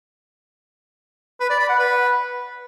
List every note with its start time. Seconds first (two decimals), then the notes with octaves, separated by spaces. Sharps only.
1.40 B4
1.50 D5
1.59 B5
1.69 F#5
1.79 B4